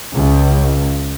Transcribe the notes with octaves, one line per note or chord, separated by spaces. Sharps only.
C#2